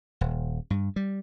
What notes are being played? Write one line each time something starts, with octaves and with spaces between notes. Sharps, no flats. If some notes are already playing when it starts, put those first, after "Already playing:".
D#1
G2
G3